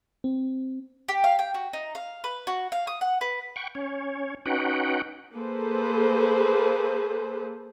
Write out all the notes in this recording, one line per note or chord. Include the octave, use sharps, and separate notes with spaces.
C4
G4
F5
G5
F#4
D#4
F5
B4
F#4
F5
D#6
F#5
B4
F#5 G5 C#6
C#4 C#5
C#4 D#4 F#4 B4 F#5 G5
A#3 G#4 A4 B4 C5